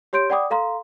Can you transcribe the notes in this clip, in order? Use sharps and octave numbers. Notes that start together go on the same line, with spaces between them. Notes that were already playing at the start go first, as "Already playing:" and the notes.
G4 C#5 C6 G6 D7
D5 F#5 G5 B5 D6 D#6
A4 F5 A#5 C6